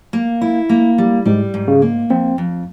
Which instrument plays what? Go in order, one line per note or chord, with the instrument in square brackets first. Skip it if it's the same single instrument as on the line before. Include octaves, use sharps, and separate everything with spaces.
[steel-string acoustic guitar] A#3
E4
A#3
G3
[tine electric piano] G#2 [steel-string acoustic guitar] G3
[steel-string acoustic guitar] G#2
[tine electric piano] C#3
[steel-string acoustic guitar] A#3
[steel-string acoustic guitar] F2 [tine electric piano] C4
[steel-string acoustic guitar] F2